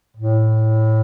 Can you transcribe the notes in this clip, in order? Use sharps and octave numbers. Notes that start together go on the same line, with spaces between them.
A2